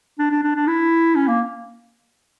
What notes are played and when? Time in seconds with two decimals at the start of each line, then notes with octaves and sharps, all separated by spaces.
0.19 D4
0.31 D4
0.43 D4
0.55 D4
0.67 E4
1.15 C#4
1.28 A#3